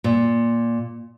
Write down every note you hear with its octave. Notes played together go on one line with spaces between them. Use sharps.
A#2